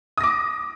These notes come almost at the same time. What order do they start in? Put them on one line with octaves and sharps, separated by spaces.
D#6 A#6 D6